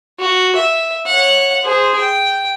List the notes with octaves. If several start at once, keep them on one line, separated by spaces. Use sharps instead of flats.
F#4
E5
C#5 F#5
G#4 C5
G5